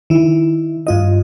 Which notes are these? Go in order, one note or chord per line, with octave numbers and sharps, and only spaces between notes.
D#3 E4
G2 F4 D#5